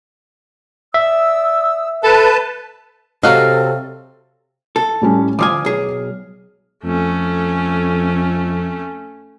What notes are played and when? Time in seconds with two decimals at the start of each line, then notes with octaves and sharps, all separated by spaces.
0.94 D5 E5 D#6 E6
2.04 A4 B4 A5
3.23 C3 F#3 F#4 A4 D#5 F5
4.76 A4
5.02 A2 G3 C#4
5.39 D2 F3 G#5 D6 D#6 F6
5.65 B1 G#4
6.84 F2 A3 C#4